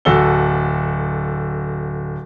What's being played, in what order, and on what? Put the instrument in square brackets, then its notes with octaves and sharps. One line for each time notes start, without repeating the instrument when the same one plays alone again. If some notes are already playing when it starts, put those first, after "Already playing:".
[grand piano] D1 F#4 A4 A5 G7